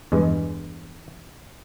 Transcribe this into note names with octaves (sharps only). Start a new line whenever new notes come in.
E2 G2 G#3